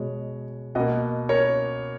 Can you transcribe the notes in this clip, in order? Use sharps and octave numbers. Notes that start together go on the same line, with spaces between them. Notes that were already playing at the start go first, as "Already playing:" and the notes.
Already playing: B2 G#3 C#5
B2 A#3 D#5 F#5
A#4 C#5